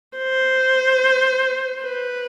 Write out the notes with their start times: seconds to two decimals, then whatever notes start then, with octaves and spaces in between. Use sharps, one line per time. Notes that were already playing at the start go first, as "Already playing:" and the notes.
0.18 C5
1.84 B4